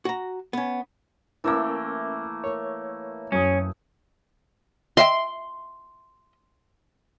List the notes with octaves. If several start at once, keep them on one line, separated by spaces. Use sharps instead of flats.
F#4 A#5
B3 C#4
E3 A3 A#3 C#4 E4 A#4 E5 E6
A#4 C#5
F#2 C#4 D#6
D#5 E5 G5 C6